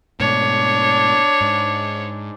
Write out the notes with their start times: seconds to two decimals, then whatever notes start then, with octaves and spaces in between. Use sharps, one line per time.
0.20 G#2 B2 A3 D4 C#5
1.41 G#2